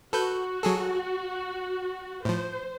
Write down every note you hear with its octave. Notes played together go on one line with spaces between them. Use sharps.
F#4 A4 B4 G6
F#3 G#4 A4
A2 F3 C5